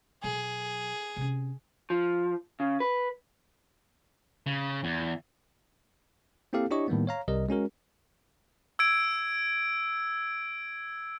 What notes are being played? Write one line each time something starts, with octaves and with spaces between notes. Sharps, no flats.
B2 F#3 G#4
C3 C#4
F3
C#3
B4
C#3
E2
A#3 C4 E4 G4 A4 F5
D4 E4 G4 C#5 D#5 C#6
A2 D#3 G3 A#3 B3
C#5 F5 A#5
C2 C3 G3 A#4 D#5
G#3 C#4 F#4 A#4
E6 G#6 D7